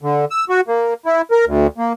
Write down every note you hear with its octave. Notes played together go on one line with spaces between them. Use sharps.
D3
E6
F#4
A#3
E4
A#4
D2
A#3